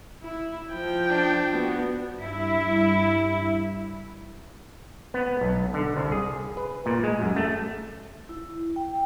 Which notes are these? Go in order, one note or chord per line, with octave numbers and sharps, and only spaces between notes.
E4
F3 G5
D4
B3 F#4
G2 E4
B3
B1
D3
C2
G#4
B4
A#2
G#3
F#2
A3
E4
G5